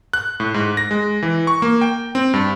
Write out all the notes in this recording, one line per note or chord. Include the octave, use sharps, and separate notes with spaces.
F#6
A2
G#2
A#6
G#3
E3
C#6
A#3
G5
C4
G2